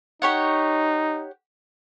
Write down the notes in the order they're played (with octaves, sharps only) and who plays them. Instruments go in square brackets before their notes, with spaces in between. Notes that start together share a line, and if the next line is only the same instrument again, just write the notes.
[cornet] D#4 [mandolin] G4 C#5 F#5